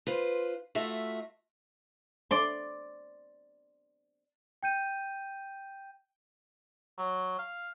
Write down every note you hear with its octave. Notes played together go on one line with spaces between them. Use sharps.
F4 B4 C5
A3 F4 F#4 E5
D5 C6
G5 G6 D#7
F#3
F5